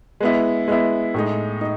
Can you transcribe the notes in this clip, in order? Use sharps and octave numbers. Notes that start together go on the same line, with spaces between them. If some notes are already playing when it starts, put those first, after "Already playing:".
G#3 B3 E4
G#3 B3 E4
A2 G#3 D#4
D#4